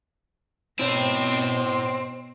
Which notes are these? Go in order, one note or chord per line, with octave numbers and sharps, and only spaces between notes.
B2 C4 E4 C#5